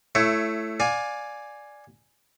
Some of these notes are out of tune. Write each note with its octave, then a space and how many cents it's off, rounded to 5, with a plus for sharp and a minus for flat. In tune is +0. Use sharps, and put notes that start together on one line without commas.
A3 +0 E4 +20 C#5 +0
D5 +0 F5 +25 G#5 +0